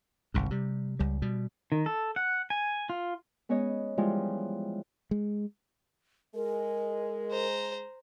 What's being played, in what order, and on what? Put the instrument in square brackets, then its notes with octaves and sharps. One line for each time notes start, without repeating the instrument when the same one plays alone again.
[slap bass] G1 C2 G#2
C3 G3
C#2 G3
B2 G3
[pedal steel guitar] D#3
A4
F#5
G#5
F4
[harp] G#3 B3 C#4 C#5 D#5
E3 F3 G3 G#3
[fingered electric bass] G#3
[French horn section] G#3 [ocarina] A#4
[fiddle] C5 A#5